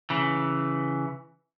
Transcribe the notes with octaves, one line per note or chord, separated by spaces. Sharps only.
C#3 E3